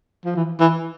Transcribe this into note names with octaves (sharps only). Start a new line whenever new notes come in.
F3
E3
E3